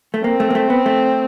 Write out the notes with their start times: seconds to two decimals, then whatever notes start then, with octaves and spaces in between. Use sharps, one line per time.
0.14 A3
0.24 A#3 C4
0.40 A3
0.50 A#3
0.55 A3
0.70 B3
0.86 A3